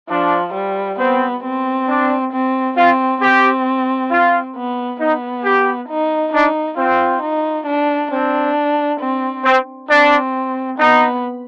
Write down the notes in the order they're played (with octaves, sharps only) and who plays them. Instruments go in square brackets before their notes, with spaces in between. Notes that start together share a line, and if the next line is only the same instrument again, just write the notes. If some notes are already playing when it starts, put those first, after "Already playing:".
[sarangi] F3 [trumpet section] D4
[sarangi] G3
[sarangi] B3 [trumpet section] C4
[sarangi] C4
[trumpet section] D4
[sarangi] C4
[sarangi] C4 [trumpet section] F4
[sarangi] C4 [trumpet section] G4
[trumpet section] F4
[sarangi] B3
[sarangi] B3 [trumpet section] D#4
[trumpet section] G4
[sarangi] D#4
[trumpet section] D4 [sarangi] D#4
[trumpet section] C4 [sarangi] F4
[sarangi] D#4
D4
[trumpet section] C4 [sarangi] D4
[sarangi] C4
[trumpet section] C4
[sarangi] C4 [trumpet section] D4
[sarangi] B3 [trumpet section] D#4